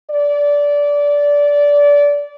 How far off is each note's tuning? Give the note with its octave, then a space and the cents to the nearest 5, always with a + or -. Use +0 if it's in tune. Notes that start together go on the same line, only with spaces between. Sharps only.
D5 -20